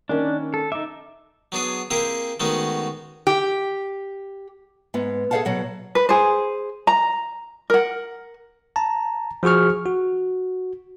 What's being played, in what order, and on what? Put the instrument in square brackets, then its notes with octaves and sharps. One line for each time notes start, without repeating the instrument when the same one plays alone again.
[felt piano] D#3 A#3 C#4 [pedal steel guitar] D4
[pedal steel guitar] A4
[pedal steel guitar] D#4 E5 [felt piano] D6
[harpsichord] F#3 B3 D4 G#4
A#3 C4 E4 G4 G#4
D#3 G#3 A3 B3 C#4 F#4
[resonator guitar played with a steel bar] G4
[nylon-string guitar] G#2 B3
G#4 A4 C5 F5 F#5 A5
B2 F#3 F#5
[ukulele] B4
G#4 C5
A#5
A#4 F#5
[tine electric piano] A5 A#5
F3 F#4 G#4 C#6 F6
F#4